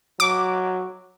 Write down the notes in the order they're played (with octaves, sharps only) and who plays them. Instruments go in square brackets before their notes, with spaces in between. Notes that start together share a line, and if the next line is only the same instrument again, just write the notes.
[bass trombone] F#3 [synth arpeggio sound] D6